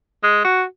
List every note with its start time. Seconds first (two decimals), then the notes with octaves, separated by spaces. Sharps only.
0.23 G#3
0.44 F#4